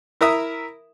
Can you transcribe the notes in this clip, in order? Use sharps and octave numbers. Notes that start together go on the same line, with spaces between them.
E4 A#4 E5 D#6